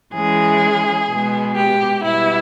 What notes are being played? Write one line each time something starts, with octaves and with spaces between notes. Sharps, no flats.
E3 G#3 C#4 G#4
B2 G#3 B3
G4
B2 G3 B3 E4